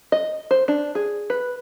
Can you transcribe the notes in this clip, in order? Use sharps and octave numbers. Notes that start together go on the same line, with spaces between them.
D#5
C5
D4
G#4
B4